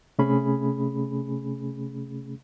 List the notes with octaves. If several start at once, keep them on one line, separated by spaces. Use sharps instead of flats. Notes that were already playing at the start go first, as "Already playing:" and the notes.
C3 A3 C#4 G#4 B5